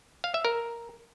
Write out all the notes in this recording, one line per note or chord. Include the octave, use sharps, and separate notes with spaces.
F5
E5
A#4